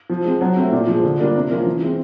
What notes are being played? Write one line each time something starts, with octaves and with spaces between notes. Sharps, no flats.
F3
G#3 C4
F#3
A3 C4
A#2
F3 G#3
D3
G3 A#3 D4 F4
C3
F3 A#3 C#4 F4
E3
G#3 C4